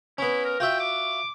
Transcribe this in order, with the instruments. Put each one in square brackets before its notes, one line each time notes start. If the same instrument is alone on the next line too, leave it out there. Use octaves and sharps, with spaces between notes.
[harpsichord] B3 C#4 [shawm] E4
[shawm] A#4
[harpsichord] F4 F#4 E5 [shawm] G5
[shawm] D6